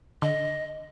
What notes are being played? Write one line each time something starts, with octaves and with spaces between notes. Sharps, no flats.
D3 D#5